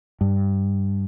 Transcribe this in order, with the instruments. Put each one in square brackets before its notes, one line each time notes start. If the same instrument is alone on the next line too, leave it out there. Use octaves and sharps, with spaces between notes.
[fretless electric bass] G2